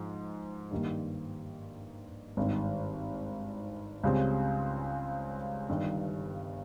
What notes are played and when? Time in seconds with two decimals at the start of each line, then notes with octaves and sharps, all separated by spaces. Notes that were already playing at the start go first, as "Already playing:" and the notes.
Already playing: G#2 F3
0.71 G2 D#3 G3 A#3
2.37 G#1 G2 D#3
4.04 C#2 C#3 G3 C4
5.69 G1 G2 D#3